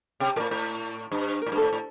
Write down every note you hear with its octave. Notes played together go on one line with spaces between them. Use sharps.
C3 G5
A2 A#2 A#4
A2 C5
G2
A2 A#4
G2
A2 A4
A2